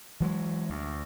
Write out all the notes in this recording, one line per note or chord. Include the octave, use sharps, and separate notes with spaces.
E3 F#3 G#3
D2